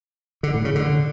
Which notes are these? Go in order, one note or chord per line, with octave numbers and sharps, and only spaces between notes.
D3
A2
C#3
D3